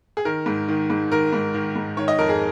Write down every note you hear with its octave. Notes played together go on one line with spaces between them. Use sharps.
G#4
D#3 A#4
G#2
D#3
G#2
D#3 A#4
G#2
D#3
G#2
D#3 C#5
D#5
F2 A#4
G#4